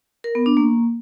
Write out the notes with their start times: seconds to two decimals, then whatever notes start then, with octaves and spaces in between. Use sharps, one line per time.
0.24 A#4
0.35 B3
0.46 D4
0.57 A#3